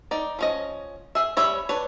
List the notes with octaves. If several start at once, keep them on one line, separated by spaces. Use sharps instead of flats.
D#4 D5
F3 C#4 D#5
G#4 E5
G3 C#5 E5 B5
D4 B4 C#5